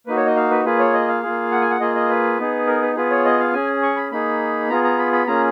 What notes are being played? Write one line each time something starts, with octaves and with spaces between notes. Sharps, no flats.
A#3 D#4 F#4 B4
C#5
D#5
F5
B4
A#3 F4 G#4 B4
C#5
D#5
F5
A#3 F4 G#4
F#5
G#5
F#5
A#3 F4 G#4 D#5
D#5
B4
B3 D#4 G#4
A#4
B4
B3 F4 G#4 B4
C#5
D#5
F5
C#4 G#4 G#5
C#6
B5
A#3 D#4 G#4 B5
B3 F4 G#4 A#5
A#5
B5
B5
A#3 C#4 F4 G#4 A#5